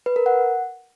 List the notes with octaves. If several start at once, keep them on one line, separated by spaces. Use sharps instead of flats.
B4
A#4
F#5